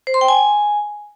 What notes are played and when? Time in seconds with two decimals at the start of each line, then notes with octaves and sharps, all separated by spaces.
0.07 C5
0.14 C6
0.21 G5
0.28 G#5